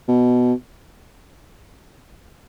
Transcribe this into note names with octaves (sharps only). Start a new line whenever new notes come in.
B2